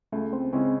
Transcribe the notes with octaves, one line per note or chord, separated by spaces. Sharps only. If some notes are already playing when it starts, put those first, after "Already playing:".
C#2 A3
C4
C#3 G#3 C4 C#4 E4